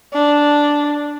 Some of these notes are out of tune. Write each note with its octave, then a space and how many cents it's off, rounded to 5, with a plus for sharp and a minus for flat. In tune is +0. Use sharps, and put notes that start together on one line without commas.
D4 -5